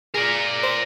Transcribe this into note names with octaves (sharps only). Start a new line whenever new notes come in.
G#4 A#4 D5
C5